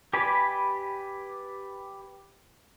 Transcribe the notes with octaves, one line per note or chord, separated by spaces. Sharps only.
G4 B4 D5 G#5 B5